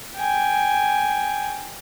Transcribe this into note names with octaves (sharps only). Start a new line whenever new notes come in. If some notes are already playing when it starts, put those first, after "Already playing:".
G5 G#5